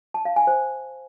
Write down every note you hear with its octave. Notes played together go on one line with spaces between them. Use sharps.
A5
F5
G#5
C5